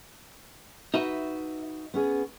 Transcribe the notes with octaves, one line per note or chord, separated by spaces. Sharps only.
D#4 F#4 B4 E5
B3 C#4 G#4